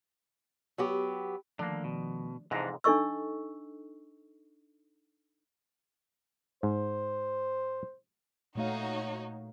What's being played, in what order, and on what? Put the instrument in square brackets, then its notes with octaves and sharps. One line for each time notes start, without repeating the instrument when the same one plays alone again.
[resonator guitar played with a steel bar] F#3 B3 G4
[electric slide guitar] D3 A#3 [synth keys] D#3 F3 A3 [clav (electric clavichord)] D4
[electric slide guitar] B2
[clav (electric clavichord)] F2 G#2 A#5 [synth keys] C3 [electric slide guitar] E3 D4
[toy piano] D4 D#4 A4 D#5 C#6 E6
[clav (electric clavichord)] G#2 [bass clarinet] C5
[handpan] A#2 A3 F5 [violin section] D#4 F#4 C#5